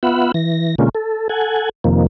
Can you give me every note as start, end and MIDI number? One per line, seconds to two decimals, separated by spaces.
0.03 0.32 59
0.03 0.32 65
0.03 0.32 76
0.03 0.32 78
0.03 0.32 83
0.34 0.75 52
0.34 0.75 94
0.78 0.89 47
0.78 0.89 50
0.78 0.89 56
0.78 0.89 58
0.78 0.89 61
0.78 0.89 65
0.95 1.28 69
1.29 1.69 69
1.29 1.69 78
1.29 1.69 80
1.84 2.06 41
1.84 2.06 48
1.84 2.06 51
1.84 2.06 53
1.84 2.06 58